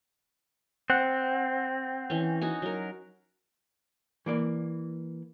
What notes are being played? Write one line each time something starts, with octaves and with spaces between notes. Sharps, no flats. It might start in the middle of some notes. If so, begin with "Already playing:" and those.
C4 F#5
E3 C#4
D#4 F#4 G#5
F#3 A#4
E3 A#3 D5